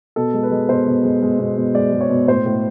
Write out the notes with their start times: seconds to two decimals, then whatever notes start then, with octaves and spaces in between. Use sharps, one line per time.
0.16 B2 A4
0.33 G#3
0.43 B4
0.52 G#3
0.69 B2 C5
0.87 B2
1.04 G#3
1.22 G#3
1.39 B2
1.57 B2
1.74 G#3 D5
1.92 G#3
2.01 C#5
2.10 B2
2.27 A2 C5
2.46 A2